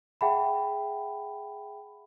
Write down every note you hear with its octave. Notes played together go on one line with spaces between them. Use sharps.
G#4 E5 F#5 G5 A5 B5